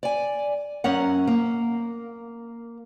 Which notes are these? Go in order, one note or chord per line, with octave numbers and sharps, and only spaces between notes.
D5 G#5
F#2 C#4 A#4 F#5
A#3